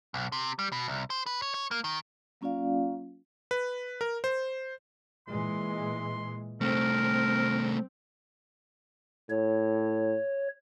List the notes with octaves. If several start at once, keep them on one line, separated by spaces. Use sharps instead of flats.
B1
C3
G3
B2
C2
C5
B4
C#5
C#5
A#3
D#3
F#3 A#3 C#4 F4 D5 F5
B4
A#4
C5
A#2 E3 G#3 C6
C2 A3 C4 A#4
A2 C#5